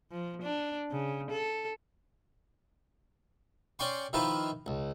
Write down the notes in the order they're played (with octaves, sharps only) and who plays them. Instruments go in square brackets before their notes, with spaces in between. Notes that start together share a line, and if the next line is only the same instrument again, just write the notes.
[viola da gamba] F3
D4
C#3
A4
[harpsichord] C#4 D5 G5 C6 C#6
D#3 F3 E4 F4 B4
C#2